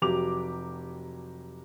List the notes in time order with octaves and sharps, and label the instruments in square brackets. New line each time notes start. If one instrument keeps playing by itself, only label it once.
[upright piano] F1 F#3 G4 D6 F7